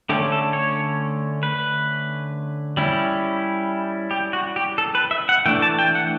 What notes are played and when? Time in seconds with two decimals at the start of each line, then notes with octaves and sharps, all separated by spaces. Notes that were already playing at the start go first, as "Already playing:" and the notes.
0.09 D3 A3 C#4 G4
0.32 A4
0.53 C#5
1.43 B4
2.77 G3 C#4 E4
4.11 G4
4.33 F#4
4.56 G4
4.78 A4
4.95 B4
5.11 E5
5.29 F#5
5.46 E3 A3 D4 G5
5.62 A5
5.79 G5
5.95 F#5